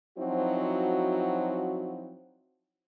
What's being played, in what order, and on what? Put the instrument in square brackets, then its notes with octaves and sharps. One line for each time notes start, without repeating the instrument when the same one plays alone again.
[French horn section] F3 F#3 C4 D#4 E4 F#4